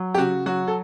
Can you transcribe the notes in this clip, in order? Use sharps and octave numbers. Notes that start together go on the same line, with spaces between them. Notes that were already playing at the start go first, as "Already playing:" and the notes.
Already playing: F#3
G4
C#3 F#4
F#3 F#4
A4